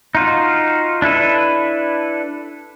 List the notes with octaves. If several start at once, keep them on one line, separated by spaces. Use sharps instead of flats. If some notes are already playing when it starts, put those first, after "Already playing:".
D#4 F4 F#4
D4 E4 A4 B4